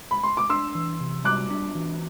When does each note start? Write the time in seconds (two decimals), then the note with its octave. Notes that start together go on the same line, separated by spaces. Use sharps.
0.11 B5
0.23 C6
0.37 D6
0.49 D4 C6 E6
0.75 E3
1.00 C3
1.25 G3 D6 F#6
1.51 D4
1.76 E3